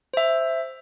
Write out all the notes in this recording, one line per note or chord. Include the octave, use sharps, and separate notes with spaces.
C5 E5